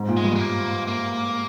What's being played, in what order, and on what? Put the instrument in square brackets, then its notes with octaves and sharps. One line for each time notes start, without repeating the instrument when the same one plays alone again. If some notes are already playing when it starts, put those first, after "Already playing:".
Already playing: [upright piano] G#2
A#2
[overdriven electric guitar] G#3
[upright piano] G2
[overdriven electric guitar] G#3
A#3
A#3